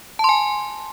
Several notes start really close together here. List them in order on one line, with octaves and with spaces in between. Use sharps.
A5 C6 G#5